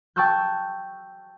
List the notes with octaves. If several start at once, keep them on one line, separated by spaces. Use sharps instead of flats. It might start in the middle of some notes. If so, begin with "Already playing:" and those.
G5 A5 C#6 E6 F#6 G6